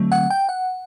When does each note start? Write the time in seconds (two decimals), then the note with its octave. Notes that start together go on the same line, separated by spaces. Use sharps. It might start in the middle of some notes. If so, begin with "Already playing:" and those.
Already playing: D3 F#3 A3 C4
0.12 F#5
0.30 G5
0.49 F#5